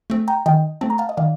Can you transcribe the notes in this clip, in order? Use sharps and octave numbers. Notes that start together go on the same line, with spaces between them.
A3 C4
G5 A#5
D#3 D#5 G5
A3 C4 A5
A#5
F5 A5
D#5
D#3 D5 F5